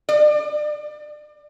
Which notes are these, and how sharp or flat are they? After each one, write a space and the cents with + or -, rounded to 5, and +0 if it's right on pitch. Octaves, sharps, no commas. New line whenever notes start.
D5 +30